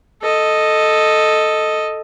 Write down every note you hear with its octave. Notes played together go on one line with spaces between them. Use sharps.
A4 D#5